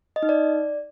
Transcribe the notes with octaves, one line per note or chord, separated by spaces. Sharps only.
D#5
D#4
D5